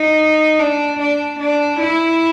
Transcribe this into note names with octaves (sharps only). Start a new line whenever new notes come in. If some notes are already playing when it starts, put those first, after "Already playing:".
Already playing: D#4
D4
D4
D4
E4